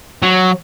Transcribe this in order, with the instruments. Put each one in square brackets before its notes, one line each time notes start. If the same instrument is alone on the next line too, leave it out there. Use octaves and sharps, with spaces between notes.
[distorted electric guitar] F#3